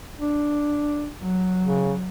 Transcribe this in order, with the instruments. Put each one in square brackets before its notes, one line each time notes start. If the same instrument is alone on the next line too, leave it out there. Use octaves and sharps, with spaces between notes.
[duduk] D4
[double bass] F#3
[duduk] C#3